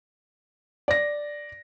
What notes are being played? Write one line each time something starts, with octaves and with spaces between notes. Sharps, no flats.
D5 A#6